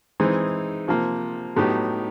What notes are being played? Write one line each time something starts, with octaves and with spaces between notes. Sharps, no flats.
E3 G#3 C4 D#4
C3 F3 A#3
A2 F#3 B3 D#4 G4